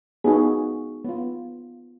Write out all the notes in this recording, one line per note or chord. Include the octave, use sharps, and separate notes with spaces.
B3 D#4 F#4 G#4
B3 F4